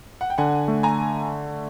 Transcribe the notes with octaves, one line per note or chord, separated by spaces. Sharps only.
F#5
G5
D3 F#5 G#5
A3
G#5 A#5